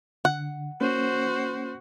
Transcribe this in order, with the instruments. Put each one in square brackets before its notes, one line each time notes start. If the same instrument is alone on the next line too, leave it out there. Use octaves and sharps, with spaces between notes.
[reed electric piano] D3 [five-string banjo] F#5
[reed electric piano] A#3 C#4 [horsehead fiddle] F#4 C5